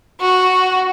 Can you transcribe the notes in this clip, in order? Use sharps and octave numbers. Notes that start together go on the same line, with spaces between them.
F#4